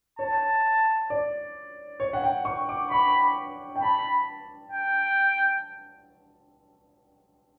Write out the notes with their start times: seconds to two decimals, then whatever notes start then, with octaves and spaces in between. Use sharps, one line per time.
0.19 C#5 A5
1.10 D5
2.00 C#5
2.13 F#5
2.24 G5
2.45 C#6
2.69 D6
2.90 B5 C#6
3.76 G5
3.82 A5 B5
4.72 G5